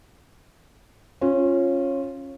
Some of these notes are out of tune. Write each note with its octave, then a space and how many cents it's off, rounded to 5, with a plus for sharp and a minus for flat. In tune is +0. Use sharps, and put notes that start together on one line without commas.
C#4 -20 F4 +0